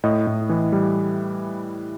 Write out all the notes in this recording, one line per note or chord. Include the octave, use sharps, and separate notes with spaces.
A2 D#5
A2
E3
G3